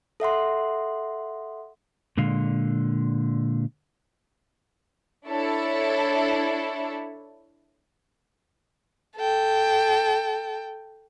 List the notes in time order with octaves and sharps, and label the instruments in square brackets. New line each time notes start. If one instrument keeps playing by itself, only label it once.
[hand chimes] A4 E5 F#5 C6
[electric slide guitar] A#2 D3 G#3 F5
[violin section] D4 E4 A4 C#5
[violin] A4 G5